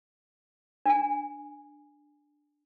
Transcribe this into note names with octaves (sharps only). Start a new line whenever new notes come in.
D4 G#5